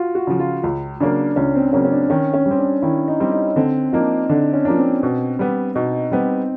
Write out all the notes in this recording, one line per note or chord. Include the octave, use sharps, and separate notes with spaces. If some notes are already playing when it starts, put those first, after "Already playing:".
Already playing: F4 F#4
F#4
C#3 F3
F4
C#2
C#3 F#3 A#3 D4
C#2 C#4
C4
C#3 F#3 A#3 C#4
C#4
D4
D#3 C#4
C#4
G3
C4
D4
D#3 E4
D#4
G3 C4
D#4
D3 C4
F3 A#3 D4 D#4
D3 D4
C#4
F3 A#3 D4
C4
B2
G3 B3
B2 D#4
G3 B3 C4